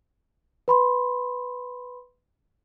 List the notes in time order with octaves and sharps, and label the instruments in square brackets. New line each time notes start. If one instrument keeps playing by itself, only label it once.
[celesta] B4 B5 C6